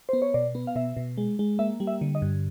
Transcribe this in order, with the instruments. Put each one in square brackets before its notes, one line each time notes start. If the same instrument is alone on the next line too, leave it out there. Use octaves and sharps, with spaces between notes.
[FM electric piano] B3 C5
C#5
B2 D5
B3
F5
B2 E5
B2
G#3
G#3
A#3 E5
G3
E5
D3
D#5
G2